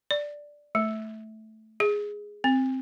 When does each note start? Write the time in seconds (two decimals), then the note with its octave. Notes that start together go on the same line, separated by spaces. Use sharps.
0.11 D5
0.75 A3
1.80 G#4
2.44 C4